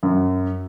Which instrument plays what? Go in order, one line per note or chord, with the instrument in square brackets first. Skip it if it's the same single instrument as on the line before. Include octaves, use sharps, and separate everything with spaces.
[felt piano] F#2